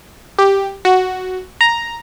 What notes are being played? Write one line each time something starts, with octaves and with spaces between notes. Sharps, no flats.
G4
F#4
A#5